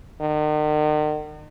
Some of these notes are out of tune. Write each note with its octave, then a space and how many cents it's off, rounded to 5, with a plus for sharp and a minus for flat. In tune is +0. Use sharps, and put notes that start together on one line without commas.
D#3 -45